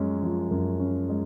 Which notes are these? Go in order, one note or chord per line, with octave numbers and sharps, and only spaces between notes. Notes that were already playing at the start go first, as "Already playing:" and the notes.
Already playing: F#2 F3 G#3 C#4
F3
F#2
C#4
G#3